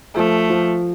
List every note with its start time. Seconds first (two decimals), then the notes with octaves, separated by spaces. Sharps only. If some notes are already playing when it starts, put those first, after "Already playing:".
0.15 F3 A3
0.50 F3